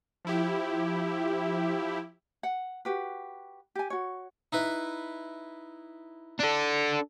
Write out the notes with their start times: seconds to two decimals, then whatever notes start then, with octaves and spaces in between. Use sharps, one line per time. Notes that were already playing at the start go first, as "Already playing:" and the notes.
0.25 F3 E4 G4
2.43 F#5
2.85 F#4 G4 B4
3.75 G4 G#5
3.90 F#4 C#5
4.52 D#4 E4 B4
6.39 D4 A4